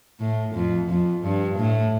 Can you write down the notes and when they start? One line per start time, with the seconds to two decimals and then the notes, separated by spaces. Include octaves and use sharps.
0.20 A2
0.54 F2
0.89 F2
1.23 G2
1.58 A2